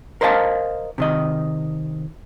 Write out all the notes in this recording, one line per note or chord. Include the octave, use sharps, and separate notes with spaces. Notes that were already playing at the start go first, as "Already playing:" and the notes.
A#4 C5 D#5 F5 A5
C3 D#3 D#5